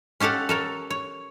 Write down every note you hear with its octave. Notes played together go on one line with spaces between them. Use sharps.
C#4 G4 A4 F5 F#5
A4 A#4 C#5
C#5